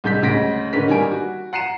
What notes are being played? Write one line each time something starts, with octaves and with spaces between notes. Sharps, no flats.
C2 G#3 G6 B6
D2 C#3 G#3 A#6 B6 D7
G#2 D3 D#3 C#4 B4 B6
D#3 G3 A#3 G#5 D7
F#4
F#5 A#5 C7 C#7 D#7 E7